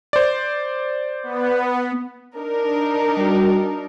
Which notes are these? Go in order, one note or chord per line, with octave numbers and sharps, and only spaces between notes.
C5 D5
B3
D4 D#4 A#4
G3 F#4